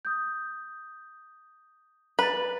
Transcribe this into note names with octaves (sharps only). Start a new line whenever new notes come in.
D#6 G6
B4 A#5 A6